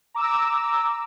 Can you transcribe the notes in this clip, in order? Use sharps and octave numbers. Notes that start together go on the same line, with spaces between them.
A#5 D6 E6